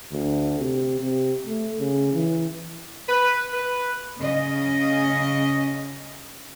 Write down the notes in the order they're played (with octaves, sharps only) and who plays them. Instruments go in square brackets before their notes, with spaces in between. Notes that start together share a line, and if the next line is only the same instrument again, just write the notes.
[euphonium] D2
C3
C3
A3
C#3
E3
[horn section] B4
B4
[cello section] C#3 C#4 D#5